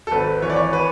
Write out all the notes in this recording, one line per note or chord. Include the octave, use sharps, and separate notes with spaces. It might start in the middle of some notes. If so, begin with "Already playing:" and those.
A4
G#1 B4
E3 C#5
D5
C#5
B4